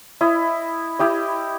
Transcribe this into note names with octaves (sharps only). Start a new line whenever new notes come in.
E4 D#5
E4 G4 D#5